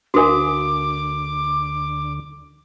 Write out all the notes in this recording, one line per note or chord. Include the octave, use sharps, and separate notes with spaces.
D2 D3 D4 F#4 A#4 F5 G#5 D6